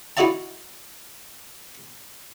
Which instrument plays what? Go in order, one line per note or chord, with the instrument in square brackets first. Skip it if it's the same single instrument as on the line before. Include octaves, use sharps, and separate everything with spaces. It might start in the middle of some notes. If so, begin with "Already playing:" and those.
[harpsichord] D#4 E4 F#4 D5 E5 A5